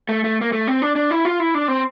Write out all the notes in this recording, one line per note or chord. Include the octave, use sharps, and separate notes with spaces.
A3
A3
A#3
A3
C4
D4
D4
E4
F4
E4
D4
C4